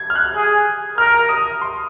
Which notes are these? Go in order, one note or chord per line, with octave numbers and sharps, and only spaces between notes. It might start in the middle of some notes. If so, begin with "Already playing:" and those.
Already playing: G#6
F6
F#6
G#4
A#4 F6
D#6
C6